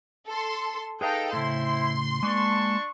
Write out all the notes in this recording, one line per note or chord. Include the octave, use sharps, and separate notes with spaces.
A4 C6
D#4 G#4 A4 B4 F5 G5
A2 C#3 C4 E4 C6
G#3 A#3 D4 A5 C#6